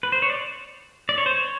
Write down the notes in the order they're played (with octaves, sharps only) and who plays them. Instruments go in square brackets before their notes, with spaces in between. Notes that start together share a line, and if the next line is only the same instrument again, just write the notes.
[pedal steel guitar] B4
C5
C#5
D5
D5
C#5
C5
C#5